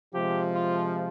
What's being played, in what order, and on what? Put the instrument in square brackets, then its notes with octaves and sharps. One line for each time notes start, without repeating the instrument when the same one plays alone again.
[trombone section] C3 F3 G#3 [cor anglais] G4
[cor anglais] F4